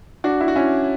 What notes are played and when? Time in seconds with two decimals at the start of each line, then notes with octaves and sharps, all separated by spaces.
0.24 D4 F#4
0.41 E4
0.48 F#4
0.56 C#4 E4